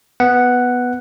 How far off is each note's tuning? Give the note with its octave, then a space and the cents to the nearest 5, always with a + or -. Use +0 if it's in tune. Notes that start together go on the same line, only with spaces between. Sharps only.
B3 +0 F#5 +0